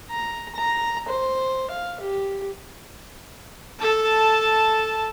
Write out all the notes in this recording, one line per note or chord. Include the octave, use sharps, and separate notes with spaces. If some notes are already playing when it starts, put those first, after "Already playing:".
A#5
A#5
C5
F5
G4
A4 A5